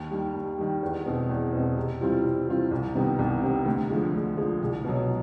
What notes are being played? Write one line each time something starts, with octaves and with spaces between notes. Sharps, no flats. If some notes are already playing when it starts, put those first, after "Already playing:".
Already playing: D#2
D#3 G3
D#2
D#3 G3
E2
B2 G#3 C4
E2
B2 G#3 C4
C3
E3 G3 C4 F4
C3
E3 G3 C4 F4
C2
C3 D#3 G3 B3
C2
C3 D#3 G3 B3
D2
D3 F3 G#3
D2
D3 F3 G#3
C2
B2 F#3